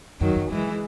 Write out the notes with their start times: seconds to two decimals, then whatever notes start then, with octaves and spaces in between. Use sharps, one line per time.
0.21 F#2 D#3 F#3
0.36 F#2
0.51 F#2 E3 G#3